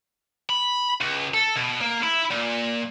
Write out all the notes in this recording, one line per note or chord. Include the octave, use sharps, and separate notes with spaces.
B5
C#2
A4
B2
A#3
E4
A#2